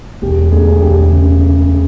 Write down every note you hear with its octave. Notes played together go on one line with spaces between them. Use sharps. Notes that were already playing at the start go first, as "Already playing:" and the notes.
E1 G4
D2 G#4
E1 G4
C#3